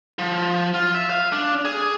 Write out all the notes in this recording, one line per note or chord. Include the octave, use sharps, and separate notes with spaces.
F3
F4
E5
F5
D4
G#4